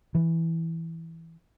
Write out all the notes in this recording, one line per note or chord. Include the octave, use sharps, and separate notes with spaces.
E3